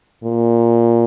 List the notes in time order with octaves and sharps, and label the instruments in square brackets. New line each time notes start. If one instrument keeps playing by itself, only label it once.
[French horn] A#2